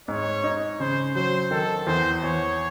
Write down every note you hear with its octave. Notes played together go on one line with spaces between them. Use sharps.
G#2 C#5
D#4
C#3 C5
F#3 C5
D#3 A4
E2 C5
E2 C#5